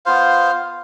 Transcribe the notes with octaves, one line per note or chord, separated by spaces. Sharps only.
B3 F4 C5 F5